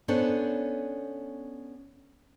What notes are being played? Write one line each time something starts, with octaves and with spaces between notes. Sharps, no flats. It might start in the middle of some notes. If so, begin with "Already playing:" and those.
B3 C#4 D4 A4 C5 C#5